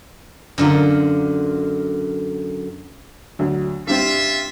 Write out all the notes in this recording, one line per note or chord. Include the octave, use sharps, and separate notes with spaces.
F#2 D3 F4
D2 F#3
G2 G3 C4 F4 E5